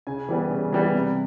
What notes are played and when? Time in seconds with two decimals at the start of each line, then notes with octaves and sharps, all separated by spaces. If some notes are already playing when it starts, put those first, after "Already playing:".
0.07 C#3 G#5
0.29 E3 G3 B3
0.51 C#3
0.72 E3 G3 B3
0.94 C3